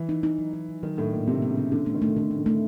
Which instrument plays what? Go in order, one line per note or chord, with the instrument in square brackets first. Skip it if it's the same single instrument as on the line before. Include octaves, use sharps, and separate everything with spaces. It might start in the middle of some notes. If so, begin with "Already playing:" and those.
Already playing: [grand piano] E3
[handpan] D#4
D#4
F#3
D#4
F#3
[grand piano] D#3 [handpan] F#3
[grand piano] A2 [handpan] D4
[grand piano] A#2 [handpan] F#3
[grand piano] C3 [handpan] F#3
[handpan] B3
[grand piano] C#3
[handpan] B3
[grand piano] D3 [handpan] C#4
[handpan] A3
[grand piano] D#3
[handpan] A3
[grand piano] D3 [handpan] A3
[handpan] A3
[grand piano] D3
[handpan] A3